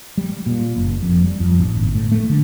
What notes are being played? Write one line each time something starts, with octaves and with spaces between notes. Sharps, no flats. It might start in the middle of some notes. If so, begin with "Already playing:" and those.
G3
A#2
F#1
F2
G3
F2
A1
G1
A2
A3
D3